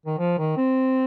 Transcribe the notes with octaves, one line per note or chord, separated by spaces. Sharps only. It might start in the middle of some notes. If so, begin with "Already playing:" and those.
D#3
F3
D#3
C4